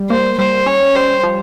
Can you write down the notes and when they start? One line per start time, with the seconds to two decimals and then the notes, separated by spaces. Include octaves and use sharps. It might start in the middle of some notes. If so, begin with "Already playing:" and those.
Already playing: G3
0.10 A#3 C5
0.38 G3 C5
0.66 C#4 C#5
0.95 G3 C5
1.23 F3